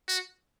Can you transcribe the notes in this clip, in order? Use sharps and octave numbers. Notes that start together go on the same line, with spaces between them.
F#4